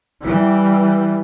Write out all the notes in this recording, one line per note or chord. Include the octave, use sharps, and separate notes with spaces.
E3 G3